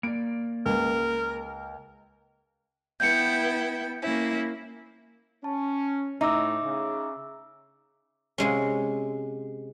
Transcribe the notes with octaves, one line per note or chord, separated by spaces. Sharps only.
A#3 D5 D7
C#2 A#4
B3 E4 G5 G6 C#7
A#3 C#4 E4
C#4 A5
A2 D#4 E5 D6 E6
C#3
C3 G#3 C#4